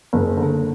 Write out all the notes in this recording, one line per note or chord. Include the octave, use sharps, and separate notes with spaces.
F#1
D3